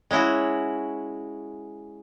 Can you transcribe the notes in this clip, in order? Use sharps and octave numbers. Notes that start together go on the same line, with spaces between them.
G#3 C#4 E4 F#4